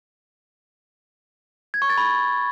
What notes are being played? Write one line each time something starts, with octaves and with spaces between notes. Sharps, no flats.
G#6
C#6
A6
B5